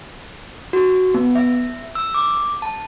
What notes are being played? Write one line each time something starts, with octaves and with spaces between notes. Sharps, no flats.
F#4
B3
E5
E6
D6
A5